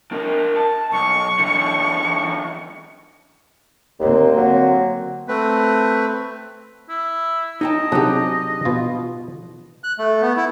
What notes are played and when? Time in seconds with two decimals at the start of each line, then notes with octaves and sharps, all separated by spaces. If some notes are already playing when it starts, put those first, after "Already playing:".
0.12 D4 A#4
0.56 A5
0.92 B1 C#6
1.39 D3 E3
4.00 D#2 D3 A#3 C4
4.37 F#3
5.28 A3 C4 B4
6.89 E4
7.61 D#4 D#5 G5 A5
7.92 C3 F#3 D4 D#4 G4 G#4
8.65 B2 F4
9.84 F#6
9.98 A3
10.22 B3
10.37 E4